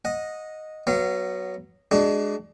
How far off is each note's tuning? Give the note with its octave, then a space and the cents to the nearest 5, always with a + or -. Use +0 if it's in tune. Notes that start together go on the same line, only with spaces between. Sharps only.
D#5 +0 F#5 -25
F#3 +10 B3 +0 F5 -30
G#3 +15 D4 +15 F#4 +45